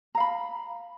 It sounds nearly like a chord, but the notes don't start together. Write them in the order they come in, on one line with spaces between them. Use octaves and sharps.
A#5 F5 B5